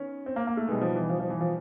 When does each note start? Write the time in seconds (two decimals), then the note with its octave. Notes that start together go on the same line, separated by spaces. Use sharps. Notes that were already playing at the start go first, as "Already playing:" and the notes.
Already playing: D#3 B3 C#4
0.26 C4
0.36 A#3
0.47 A#3
0.57 A3
0.67 B2 G3 G#3 B3 D#4
0.81 F3
0.95 E3
1.09 F3
1.20 F3
1.30 E3
1.41 F3